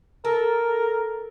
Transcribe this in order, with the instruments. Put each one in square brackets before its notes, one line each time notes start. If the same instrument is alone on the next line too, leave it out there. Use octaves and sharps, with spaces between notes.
[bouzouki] A4 [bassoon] A#4